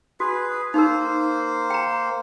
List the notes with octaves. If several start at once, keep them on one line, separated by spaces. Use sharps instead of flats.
F#4 G#4 B4
A#3 D#4 A#4 C5
G5 A#5